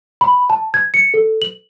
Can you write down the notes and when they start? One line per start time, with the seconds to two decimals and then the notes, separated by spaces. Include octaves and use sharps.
0.21 B5
0.50 A5
0.74 G#6
0.94 C#7
1.14 A4
1.42 F#7